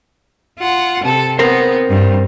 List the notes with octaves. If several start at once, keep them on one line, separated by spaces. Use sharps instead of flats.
F4 F#5
C3 A4
B3 C4 A#4 C5
G2